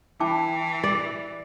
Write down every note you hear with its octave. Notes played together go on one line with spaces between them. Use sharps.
E3 E4 G5 A5 D6
D5